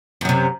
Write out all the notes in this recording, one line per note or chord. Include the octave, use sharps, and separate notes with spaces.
F#2 C3 F#3